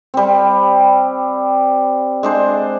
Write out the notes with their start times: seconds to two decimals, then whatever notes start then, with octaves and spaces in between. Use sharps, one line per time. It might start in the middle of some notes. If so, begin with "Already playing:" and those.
0.14 G3 C4
2.23 G#3 D4 C5